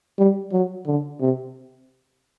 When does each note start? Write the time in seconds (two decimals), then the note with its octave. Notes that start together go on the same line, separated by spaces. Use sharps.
0.18 G3
0.53 F#3
0.87 D3
1.21 C3